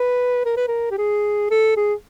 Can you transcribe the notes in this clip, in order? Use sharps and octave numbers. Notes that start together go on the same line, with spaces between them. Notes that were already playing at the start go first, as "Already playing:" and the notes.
Already playing: B4
A#4
B4
A#4
G4
G#4
A4
G#4